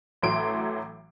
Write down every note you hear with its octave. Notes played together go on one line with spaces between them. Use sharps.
A1 A2 E3 F#3 C6 D7